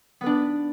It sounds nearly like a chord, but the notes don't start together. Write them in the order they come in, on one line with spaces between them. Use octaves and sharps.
B3 B4 D4